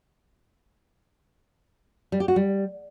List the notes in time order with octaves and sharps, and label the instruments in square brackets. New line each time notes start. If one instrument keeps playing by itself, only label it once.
[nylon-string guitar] G3
G4
F#4
G3